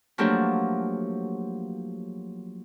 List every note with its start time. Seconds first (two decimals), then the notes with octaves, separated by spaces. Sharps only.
0.18 F3 F#3 A3 A#3 D4 G4